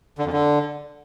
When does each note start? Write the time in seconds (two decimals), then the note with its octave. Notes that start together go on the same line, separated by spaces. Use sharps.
0.18 D3
0.25 F2
0.33 D3